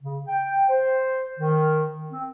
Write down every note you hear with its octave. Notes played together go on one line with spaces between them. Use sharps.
C#3
G5
C5
D#3
C4